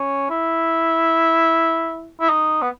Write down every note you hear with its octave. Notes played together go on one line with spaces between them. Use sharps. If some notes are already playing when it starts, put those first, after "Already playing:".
Already playing: C#4
E4
E4
D#4
B3